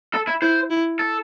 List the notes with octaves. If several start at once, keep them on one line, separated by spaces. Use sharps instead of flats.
A4
E4
E4 C5
E4
A4